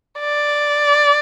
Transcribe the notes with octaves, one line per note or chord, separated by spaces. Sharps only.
D5